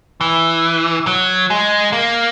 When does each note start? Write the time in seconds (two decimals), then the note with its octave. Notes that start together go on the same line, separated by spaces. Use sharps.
0.21 E3
1.07 F#3
1.50 G#3
1.93 A#3